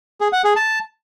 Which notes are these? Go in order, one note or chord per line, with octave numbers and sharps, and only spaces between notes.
G#4
F#5
G#4
A5